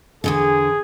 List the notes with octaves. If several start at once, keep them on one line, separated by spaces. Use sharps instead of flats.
E2 G#2 D3 G#4